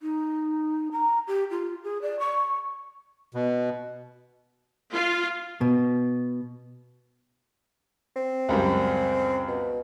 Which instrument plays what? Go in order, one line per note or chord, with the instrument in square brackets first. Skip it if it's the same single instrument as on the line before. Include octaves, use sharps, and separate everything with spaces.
[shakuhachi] D#4
A#5
G4
F4
G#4
D5
C#6
[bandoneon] B2
[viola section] F4
[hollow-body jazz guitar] B2
[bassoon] C4
[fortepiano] C#2 F#2 G3
[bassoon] B2